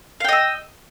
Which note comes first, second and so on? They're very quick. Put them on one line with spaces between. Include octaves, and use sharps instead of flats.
F5 G5 D#5 E6